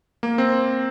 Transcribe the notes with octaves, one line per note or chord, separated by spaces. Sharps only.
A#3
C4